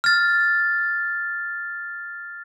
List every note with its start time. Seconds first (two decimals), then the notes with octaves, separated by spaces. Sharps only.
0.04 F6 A6